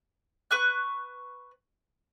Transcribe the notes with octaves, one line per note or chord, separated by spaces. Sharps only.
B4 C#6 F#6